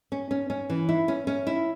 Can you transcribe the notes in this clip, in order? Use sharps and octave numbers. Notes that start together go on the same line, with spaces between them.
C#4
C#4
C#4
E3
E4
C#4
C#4
E4